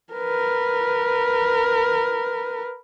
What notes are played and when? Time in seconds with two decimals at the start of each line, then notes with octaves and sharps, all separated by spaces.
0.13 A#4 B4